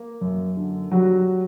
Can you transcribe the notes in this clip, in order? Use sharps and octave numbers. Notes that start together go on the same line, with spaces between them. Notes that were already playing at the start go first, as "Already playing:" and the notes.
Already playing: A#3
F#2
D3
F#3 G3 F#4